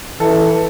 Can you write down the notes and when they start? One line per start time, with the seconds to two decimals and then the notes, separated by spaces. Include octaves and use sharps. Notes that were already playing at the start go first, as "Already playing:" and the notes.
0.20 E3 A4